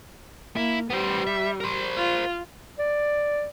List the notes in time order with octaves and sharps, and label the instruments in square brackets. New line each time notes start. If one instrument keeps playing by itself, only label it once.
[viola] A#3 [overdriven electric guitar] E4
[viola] G3 [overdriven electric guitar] B3 C5
[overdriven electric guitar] E5
A#4 C5
[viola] F4
[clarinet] D5